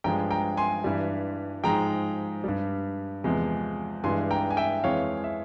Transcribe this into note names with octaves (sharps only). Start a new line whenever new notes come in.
G2 F3 G#3 G5 A#5
G5 A#5
G#5 C6
G2 E3 G3
G#2 F3 G#3 G5 A#5
G2 G3
E2 C3 F3 G#3
G2 E3 G#3 G#5 C6
G5 A#5
G#5
E5 G5
F2 E3 G#3 C#5 F5
E5